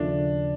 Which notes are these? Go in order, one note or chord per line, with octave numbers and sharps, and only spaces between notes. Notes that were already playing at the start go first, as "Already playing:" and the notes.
Already playing: D#2 C#3 F3 A3 D4